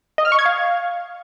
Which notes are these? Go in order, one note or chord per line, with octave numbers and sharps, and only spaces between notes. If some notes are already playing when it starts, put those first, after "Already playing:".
D#5
F6
C#6
G#6
F5